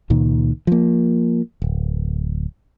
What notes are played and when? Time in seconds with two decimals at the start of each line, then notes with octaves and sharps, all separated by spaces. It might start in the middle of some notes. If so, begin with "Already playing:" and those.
0.10 C#2 A#2 D#3
0.67 F3 A#3
1.62 D1